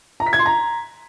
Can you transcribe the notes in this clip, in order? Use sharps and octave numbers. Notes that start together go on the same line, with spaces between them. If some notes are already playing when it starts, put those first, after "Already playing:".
A#5
B6
G#6
C6
A#5